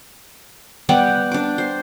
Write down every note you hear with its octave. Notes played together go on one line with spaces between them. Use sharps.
G3 B3 G4 F#5
D4 D6
C5